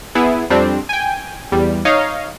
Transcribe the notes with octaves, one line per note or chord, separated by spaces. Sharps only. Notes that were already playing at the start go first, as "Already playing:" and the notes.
B3 E4 G#4
F2 G3 C4 D4
G5 G#5
E2 G3
D#4 C#5 D#5 F5